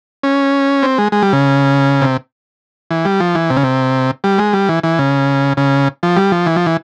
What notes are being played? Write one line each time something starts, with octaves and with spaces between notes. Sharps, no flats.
C#4
C4
G#3
G#3
G3
C#3
C3
E3
G3
F3
E3
C3
C#3
C3
G3
G#3
G3
E3
E3
C#3
C#3
F3
G3
F3
E3
F3
E3